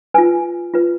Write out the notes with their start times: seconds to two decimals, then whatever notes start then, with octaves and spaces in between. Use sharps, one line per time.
0.14 F4 B4 G#5
0.74 F4 B4